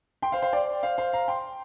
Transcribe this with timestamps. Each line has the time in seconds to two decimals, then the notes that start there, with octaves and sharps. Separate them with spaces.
0.22 G5 C6
0.32 C5 F5
0.42 C5 F5
0.53 D5 G5
0.83 C5 F5
0.98 C5 F5
1.13 F5 A#5
1.28 G5 C6